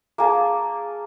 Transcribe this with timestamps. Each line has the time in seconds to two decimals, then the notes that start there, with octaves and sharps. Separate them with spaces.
0.18 A#3 G#4 A5